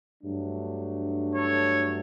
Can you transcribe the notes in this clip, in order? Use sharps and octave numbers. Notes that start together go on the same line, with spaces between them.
G2 F#3 A3 D4
A4 C#5